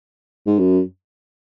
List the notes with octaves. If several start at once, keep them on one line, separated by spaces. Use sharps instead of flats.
G#2
F#2